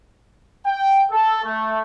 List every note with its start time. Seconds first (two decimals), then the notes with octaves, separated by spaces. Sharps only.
0.65 G5
1.10 A4
1.44 A3